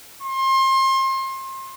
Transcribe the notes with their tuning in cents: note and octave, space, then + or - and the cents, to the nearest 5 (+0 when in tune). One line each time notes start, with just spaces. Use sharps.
C6 +30